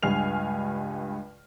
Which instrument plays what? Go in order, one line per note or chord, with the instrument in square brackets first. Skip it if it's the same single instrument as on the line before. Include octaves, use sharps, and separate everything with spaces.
[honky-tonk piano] C#2 G2 G#5 F6 C7 F7